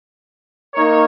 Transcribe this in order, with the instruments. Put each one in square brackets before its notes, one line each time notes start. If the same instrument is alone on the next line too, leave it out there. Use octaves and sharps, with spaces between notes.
[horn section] A#3 D#4 A#4 C#5